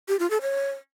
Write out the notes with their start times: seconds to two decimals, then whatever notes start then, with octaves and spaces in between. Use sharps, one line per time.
0.08 G4
0.19 F4
0.30 A4
0.41 C#5